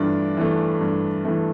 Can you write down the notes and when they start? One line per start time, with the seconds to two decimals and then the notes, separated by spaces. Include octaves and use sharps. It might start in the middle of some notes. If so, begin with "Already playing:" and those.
Already playing: G2 E3 A3 D4 F4 D5
0.37 E3 A3
0.81 G2
1.25 E3 A3